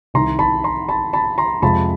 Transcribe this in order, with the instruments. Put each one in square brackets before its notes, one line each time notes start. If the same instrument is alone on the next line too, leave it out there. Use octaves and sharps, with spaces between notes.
[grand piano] C2 C3 D#3 A#5 C6
A5 B5
A#5 C6
A5 B5
A5 B5
A#5 C6
F2 C3 F3 G#3 A5 B5